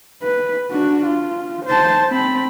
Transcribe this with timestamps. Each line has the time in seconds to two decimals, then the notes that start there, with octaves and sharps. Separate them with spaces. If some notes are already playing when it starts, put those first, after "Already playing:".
0.23 B4
0.71 D4 F#4
1.06 F4
1.65 C5 A5
2.09 C4 B5